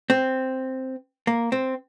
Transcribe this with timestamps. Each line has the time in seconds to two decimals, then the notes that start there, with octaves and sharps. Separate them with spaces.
0.10 C4
1.27 A#3
1.52 C4